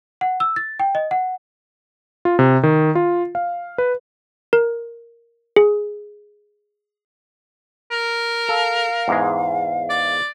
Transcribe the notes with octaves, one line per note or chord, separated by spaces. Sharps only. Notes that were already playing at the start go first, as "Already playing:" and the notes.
F#5
E6
A6
G5
D#5
F#5
F4
C3
D#3
F4
F5
B4
A#4
G#4
A#4
A4 F5
E2 G#2 G#3
D5